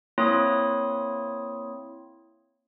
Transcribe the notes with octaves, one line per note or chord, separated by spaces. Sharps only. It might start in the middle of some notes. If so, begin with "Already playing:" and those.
A#3 C4 E4 C#5 C6 D#6